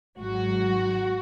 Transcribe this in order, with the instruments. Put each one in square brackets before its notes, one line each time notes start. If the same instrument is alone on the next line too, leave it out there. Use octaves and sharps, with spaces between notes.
[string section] G#1 G#2 F#3 F#4